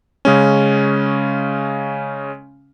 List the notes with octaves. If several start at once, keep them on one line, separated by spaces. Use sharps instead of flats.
C#3 G#3 C#4